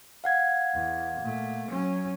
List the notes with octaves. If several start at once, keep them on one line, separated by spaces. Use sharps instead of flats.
F5 F#5 G#6
E2
A#2 A3
F#3 C#4